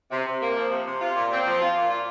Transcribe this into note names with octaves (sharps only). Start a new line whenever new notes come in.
C3
C3
A#3
F3
C3
C3
F4
A#2
C4
F3
F4
A#2
F4